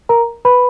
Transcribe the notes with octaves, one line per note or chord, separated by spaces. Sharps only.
A#4 A#5
B4 B5